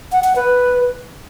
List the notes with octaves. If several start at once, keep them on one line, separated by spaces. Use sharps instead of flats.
F#5
F#5
B4